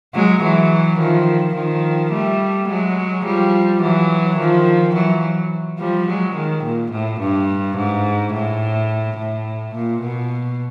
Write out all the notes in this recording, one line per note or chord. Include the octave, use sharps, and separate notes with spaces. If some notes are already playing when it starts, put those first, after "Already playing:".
F#3 G#3
E3 F#3
D#3 F3
D#3 F3
G3 A3
F#3 G#3
F3 G3
E3 F#3
D#3 F3
E3 F#3
F3 G3
F#3 G#3
D#3
A#2
A2
G2
G#2
A2
A2
A#2
B2